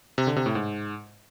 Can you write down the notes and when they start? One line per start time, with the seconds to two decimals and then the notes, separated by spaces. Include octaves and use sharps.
0.18 C3
0.27 D3
0.36 C3
0.46 A2
0.55 G#2